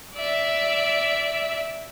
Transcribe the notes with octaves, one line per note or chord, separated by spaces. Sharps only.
D5 E5